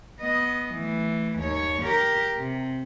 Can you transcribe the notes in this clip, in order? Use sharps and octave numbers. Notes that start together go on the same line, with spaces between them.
B3 D#5
E3 A3
D#2 C#5
G4 A#4
C3